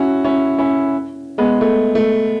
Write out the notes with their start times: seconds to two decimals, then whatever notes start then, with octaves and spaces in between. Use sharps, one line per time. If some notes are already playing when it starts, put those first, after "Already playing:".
Already playing: C#4 E4 F#4
0.24 C#4 E4
0.58 C#4 E4
1.38 G#3 B3
1.61 A3
1.95 A3